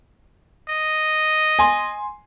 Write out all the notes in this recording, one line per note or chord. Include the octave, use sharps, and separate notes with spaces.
D#5
G#5 C6